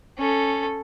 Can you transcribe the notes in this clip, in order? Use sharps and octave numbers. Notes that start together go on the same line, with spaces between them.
C#4 A4